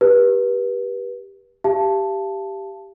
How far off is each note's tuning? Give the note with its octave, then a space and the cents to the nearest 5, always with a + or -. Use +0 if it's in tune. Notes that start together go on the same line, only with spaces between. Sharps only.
G4 +0 B4 -30
G4 +0 F5 -35 A5 +0